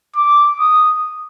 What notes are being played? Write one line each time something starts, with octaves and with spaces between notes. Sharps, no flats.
D6
D#6